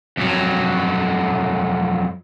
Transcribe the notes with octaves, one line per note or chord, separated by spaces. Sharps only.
F2 F#3